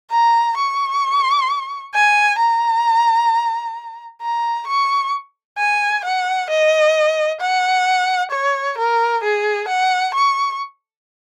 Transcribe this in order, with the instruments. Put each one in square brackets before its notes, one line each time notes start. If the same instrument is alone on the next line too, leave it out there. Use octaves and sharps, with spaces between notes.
[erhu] A#5
C#6
G#5
A#5
A#5
C#6
G#5
F#5
D#5
F#5
C#5
A#4
G#4
F#5
C#6